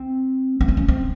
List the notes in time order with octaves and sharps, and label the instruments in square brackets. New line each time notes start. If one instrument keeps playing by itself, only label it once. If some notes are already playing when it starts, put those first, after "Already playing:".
Already playing: [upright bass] C4
B3
C4
C#4
C4